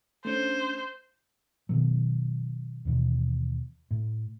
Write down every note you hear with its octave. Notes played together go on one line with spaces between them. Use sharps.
A3 C#4 D4 C5
B2 D#3 F#3
D#2 B2 E3
A2